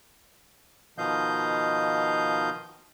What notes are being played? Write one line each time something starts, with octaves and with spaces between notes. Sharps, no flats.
B2 D#3 F3 D#5 F5 G6